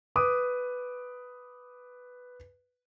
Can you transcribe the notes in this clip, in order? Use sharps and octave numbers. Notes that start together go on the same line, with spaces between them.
B4 D6 D#6